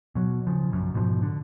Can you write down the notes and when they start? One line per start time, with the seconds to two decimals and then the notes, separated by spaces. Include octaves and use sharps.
0.15 B2 F#3
0.47 C#3 F3
0.70 A#1 F#2
0.94 F1 G#2 B2 F3
1.22 D3